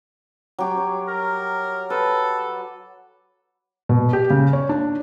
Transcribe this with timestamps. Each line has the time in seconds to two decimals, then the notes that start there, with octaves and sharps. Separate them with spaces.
0.59 F#3 G4 C#6
0.77 C#5
1.08 A#4
1.90 A4 B4
3.89 B2
4.13 G4
4.30 C#3
4.53 C#5
4.69 D4